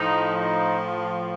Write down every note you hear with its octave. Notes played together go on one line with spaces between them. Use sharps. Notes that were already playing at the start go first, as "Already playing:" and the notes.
Already playing: A2 F3 D#4
D#4